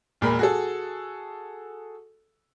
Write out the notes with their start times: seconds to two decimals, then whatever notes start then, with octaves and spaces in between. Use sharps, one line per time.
0.21 E1 A#2 G#4 A#4 B5
0.39 F#4 G#4 A4